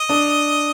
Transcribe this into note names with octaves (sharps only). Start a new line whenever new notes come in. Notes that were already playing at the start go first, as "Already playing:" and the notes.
Already playing: D#5
D4